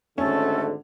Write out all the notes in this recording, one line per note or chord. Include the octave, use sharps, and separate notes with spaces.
G#1 D3 A3 C#4 A4